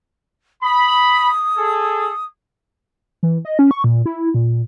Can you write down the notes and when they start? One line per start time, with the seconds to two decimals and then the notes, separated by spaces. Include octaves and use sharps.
0.63 B5 D#6
1.57 G#4 A4
3.23 E3
3.45 D#5
3.59 C#4
3.71 C#6
3.84 A#2
4.06 E4
4.34 A#2